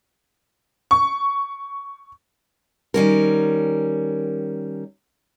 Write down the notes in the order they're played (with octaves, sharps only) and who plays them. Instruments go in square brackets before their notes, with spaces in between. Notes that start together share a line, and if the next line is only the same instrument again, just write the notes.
[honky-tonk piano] C#6
[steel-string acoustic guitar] D#3 G3 C#4 A#4